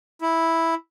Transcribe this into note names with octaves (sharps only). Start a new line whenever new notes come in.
E4